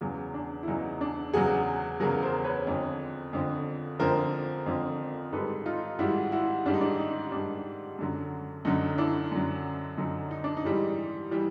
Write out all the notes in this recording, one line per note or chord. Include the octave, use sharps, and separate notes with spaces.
E2 C#3 F#3
D4
E4
E2 C#3 F#3 D#4
D4
E2 C#3 F#3 F#4 G#4
E2 C#3 F#3 G#4 A#4
A#4 C5
B4 C#5
F2 D3 F3
F2 D3 F3
F2 D3 F3 A#4 C5
F2 D3 F3
G#2 D#3 G3 A4 B4
D#4 F4
G#2 D#3 G3 E4 F#4
E4 F#4
G#2 D#3 G3 D4
D#4
D4
D#4
G#2 D#3 G3 D4
F#2 D3 F#3
F#2 D3 F#3 D#4
D4 E4
F#2 D3 F#3
F#2 D3 F#3 D#4
D#4
D4
D#4
G#2 E3 G3
E3 G3